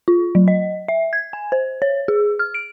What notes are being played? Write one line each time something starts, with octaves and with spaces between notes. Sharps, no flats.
F4
F#3
D#5
E5
G#6
G#5
C5
C#5
G#4
F6
D7